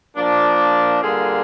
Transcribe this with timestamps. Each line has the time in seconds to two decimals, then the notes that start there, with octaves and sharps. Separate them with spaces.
0.16 A#2 F3 A#3 D4
1.02 D3 G3 A#3 F4 G#4